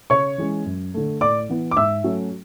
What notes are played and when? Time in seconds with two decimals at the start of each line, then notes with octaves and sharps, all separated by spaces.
0.10 C#3 C#5 C#6
0.38 E3 G#3 C#4
0.66 F#2
0.94 D3 A3
1.21 A2 D5 D6
1.49 E3 B3
1.71 D6
1.77 G#2 E5 E6
2.04 F#3 A3 C#4